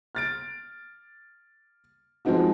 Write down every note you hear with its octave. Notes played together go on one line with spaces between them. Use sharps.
F6 A6 D7
F3 G#3 C4 D#4 F#4